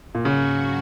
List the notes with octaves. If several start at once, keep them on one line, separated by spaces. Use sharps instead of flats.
A#2
G#2 C#3 F#3 A#3 F#4